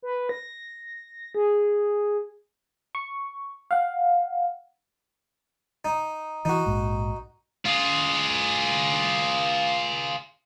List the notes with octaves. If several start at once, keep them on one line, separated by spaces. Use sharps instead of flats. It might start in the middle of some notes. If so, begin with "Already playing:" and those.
B4
A#6
G#4
C#6
F5 F#5
D#4
E3 D#4 F#4
A#1 G#2
F4 G#4